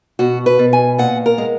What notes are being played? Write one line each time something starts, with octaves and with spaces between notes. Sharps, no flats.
B2 F#4
B4
B2
G#5
A#2 F#5
A#4
G#3